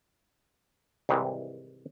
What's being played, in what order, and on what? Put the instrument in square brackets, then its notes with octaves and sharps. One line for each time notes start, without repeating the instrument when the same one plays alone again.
[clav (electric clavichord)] C2 G#2 C3 D#3 E3